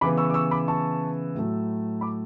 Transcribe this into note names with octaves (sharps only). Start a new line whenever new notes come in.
C#3 E3 B3 B5 D6
C#6 E6
D6
C#6 E6
B5 D6
A5 C#6
A2 F#3 A3
B5 D6